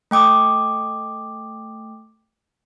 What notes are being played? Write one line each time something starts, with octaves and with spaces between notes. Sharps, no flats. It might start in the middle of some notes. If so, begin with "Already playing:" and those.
A3 G5 D6 D#6